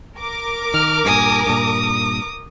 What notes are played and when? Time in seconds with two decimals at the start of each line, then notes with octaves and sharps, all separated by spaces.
0.17 A#4 D6
0.74 D#3 F6
1.05 G2 A#2 G#5 D#6
1.47 G2 A#2 D#6